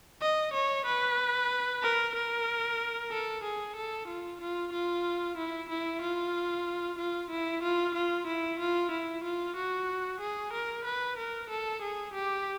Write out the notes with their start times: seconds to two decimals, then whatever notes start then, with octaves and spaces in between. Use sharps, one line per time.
0.22 D#5
0.54 C#5
0.86 B4
1.83 A#4
2.15 A#4
3.12 A4
3.44 G#4
3.76 A4
4.08 F4
4.41 F4
4.73 F4
5.37 E4
5.70 E4
6.02 F4
6.98 F4
7.30 E4
7.63 F4
7.95 F4
8.27 E4
8.59 F4
8.91 E4
9.24 F4
9.56 F#4
10.20 G#4
10.53 A#4
10.85 B4
11.17 A#4
11.50 A4
11.82 G#4
12.14 G4